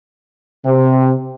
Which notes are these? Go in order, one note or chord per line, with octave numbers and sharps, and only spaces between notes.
C3